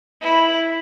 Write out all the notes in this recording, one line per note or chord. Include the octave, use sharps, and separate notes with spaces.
E4